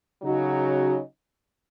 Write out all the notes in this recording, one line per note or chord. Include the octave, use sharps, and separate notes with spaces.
C#3 F#3 D#4 F#4